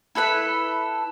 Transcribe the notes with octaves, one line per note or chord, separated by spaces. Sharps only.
E4 A4 B4 B5